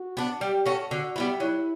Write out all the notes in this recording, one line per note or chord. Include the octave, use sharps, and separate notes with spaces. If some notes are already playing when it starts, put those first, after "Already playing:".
Already playing: F#4
B3 D4
G3 G4
C#4 F#4 A4
D3 F#4
G3 B3 E4
F#3 E4